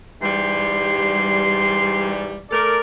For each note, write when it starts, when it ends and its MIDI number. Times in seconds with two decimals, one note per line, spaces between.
0.22 2.39 44
0.22 2.39 52
0.22 2.39 55
0.22 2.17 84
2.51 2.80 57
2.51 2.80 69
2.51 2.80 70
2.51 2.79 74